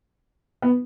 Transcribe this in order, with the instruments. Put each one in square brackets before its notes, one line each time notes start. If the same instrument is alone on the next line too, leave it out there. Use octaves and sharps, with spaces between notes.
[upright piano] B3